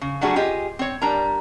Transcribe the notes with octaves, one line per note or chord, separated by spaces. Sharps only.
C#3
F#3 G3 A3 D4 F#4 G#4
F4 G4 G#4 D#5
C4 C#5
G3 D4 A#4 A#5